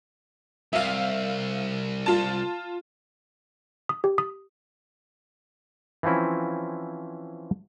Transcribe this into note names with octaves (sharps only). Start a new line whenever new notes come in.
C2 E5 F5
F4 A5
D#6
G4
D#6
E3 F3 C4 C#4 E4